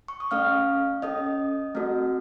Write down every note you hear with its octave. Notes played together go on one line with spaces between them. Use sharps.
C#6
D#6
A3 C#4 A4 F5 F6
C#4 A4 D#5 D#6
A3 C4 F#4 A4